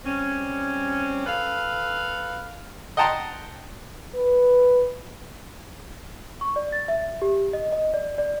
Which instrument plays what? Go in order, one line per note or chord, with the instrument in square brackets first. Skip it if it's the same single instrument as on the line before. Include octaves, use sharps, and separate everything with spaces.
[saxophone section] G3 C4 C#4
A4 B4 F5
[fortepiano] D#5 F#5 G5 A5 A#5 C6
[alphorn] B4
[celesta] C#6
D5
A6
E5
G4
D#5
D#5
D5
D5